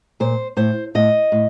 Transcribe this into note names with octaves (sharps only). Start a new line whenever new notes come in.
A#2 C5
A2 C5
A2 D#5
A2